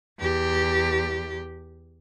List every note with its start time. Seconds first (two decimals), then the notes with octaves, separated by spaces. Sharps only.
0.19 E2 G4